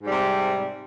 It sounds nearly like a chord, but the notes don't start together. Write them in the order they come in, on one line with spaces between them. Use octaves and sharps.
G#2 G3 C3